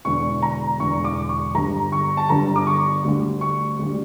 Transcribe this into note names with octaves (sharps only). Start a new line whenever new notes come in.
E1 E2 D3 C#6
A#5
E1 E2 D3 C#6
D6
C#6
G1 G2 D3 G3 A#5
C#6
A5
G1 G2 D3 G3 A#5
D6
C#6
D2 D3 G3
C#6
D2 D3 G3